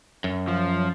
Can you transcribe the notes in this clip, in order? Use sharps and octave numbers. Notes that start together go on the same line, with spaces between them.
F#2
F3